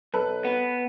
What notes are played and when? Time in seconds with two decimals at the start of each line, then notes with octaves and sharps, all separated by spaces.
0.14 B1 A4 B4
0.44 B3